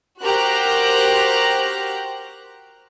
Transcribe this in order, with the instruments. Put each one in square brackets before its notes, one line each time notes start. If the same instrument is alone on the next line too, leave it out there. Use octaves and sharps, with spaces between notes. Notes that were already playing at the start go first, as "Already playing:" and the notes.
[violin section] F#4 G4 A#4 C5 A#5 F#6